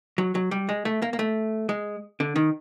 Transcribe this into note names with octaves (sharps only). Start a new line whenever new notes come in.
F#3
F#3
G3
G#3
A3
A#3
A#3
A3
G#3
D3
D#3